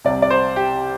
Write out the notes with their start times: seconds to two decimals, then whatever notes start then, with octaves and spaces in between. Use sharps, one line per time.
0.05 C2 C3 D5
0.22 D5
0.30 C5
0.56 G4